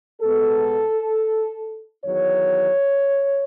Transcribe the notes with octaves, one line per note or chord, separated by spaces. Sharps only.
B2 G#3 B3 A4
E2 D#3 F#3 C#5